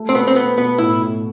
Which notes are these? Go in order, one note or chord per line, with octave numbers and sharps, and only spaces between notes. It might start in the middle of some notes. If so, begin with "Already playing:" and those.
Already playing: A3
C4
B2 B3
C4
B2 B3
B2 B3
A2 E4
A2